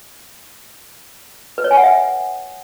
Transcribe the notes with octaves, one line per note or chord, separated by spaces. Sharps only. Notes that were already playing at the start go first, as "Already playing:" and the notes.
B4
C#5
G#5
F#5
E5